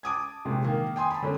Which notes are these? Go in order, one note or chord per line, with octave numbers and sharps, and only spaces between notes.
A5 D6 D#6 G#6
A#1 C3 G#3
D#3 A#3
G5 G#5 C6 D#6
A5 B5
D3 C#4